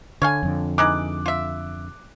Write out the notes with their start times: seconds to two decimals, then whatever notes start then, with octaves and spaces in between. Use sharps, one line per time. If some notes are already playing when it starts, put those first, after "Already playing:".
0.22 D3 C#5 F5 G#5
0.43 F2 D3
0.78 E3 D#4 G#4 D6 F#6
1.26 F4 E5